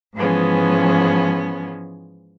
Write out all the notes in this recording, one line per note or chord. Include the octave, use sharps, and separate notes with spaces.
G#2 E3 F3 G#3 B3 C#4